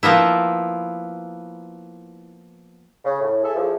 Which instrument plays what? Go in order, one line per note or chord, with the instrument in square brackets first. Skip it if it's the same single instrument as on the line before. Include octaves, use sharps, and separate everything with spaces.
[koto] F3 A#3 B3 E4
[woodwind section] C#3
A2
E4 G#4 A4 E5
E2 F3